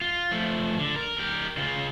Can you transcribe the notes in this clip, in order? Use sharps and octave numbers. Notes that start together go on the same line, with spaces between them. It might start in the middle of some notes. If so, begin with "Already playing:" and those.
F4
F3 A3
D3
A#4
G4 A#4
C#3 F4